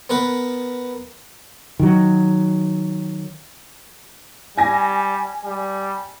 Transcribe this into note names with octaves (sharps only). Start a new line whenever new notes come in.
B3 A#4 B4
D#3 F#3
G3 G#5 A#6
G3